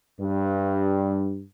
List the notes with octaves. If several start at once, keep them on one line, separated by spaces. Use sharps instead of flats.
G2